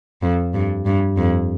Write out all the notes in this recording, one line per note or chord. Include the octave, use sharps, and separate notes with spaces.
F2
G2
G2
F2